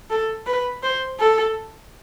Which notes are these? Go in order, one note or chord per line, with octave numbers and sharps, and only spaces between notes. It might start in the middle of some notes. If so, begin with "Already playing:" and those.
A4
B4
C5
A4